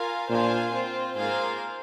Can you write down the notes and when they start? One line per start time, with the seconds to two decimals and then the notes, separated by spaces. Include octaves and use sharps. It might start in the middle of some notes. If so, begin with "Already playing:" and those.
Already playing: F4 A#4 F5 G#5
0.30 A#2 D4 F4 C5 F5 G#5
0.72 C4 F4 C5
1.16 G#2 A#3 F4 G#4 C5 F5